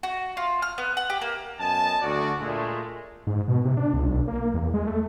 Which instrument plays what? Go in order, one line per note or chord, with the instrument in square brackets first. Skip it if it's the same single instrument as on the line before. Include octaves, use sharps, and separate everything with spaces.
[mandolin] F#4
F4
F6
B3
F#5
G4
A#3
[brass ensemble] F#2 B3 D#5 G#5 A5
D2 F#4 D5
A#2 G#3 A3
[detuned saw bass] G#2
B2
C3
D4
C#2
B1
A#3
E2
G#3
A3